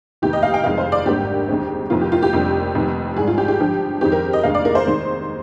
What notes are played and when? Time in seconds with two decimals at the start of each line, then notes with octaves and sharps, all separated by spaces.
0.22 F1 D#2 D#3 G4
0.33 D#5
0.43 F5
0.54 G5
0.64 F1 F2 D#3 G#3 F5
0.78 C5
0.92 D5
1.06 G#1 G2 D3 G3 A#3 G4
1.48 D#2 D3 G#3 C4
1.90 F1 F2 D#3 A#3 F4
2.01 G4
2.12 F4
2.22 G4
2.33 F1 F2 D3 G3 A#3
2.75 F1 F2 D#3
3.17 G#1 G#2 G3 G#4
3.28 F4
3.38 G4
3.48 G4
3.59 G2 D3 F3
4.01 F2 D#3 G#3 C4 G4
4.12 A#4
4.33 D#5
4.43 F1 D#2 D3 G#3 F5
4.55 D5
4.65 A#4
4.75 C5
4.86 D#2 D#3 G#3 C4